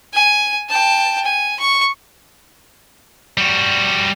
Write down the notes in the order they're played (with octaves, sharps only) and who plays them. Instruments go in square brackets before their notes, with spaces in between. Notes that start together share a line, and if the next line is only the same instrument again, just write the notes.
[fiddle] G#5
G5 A5
G#5
C#6
[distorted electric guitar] G3 F#4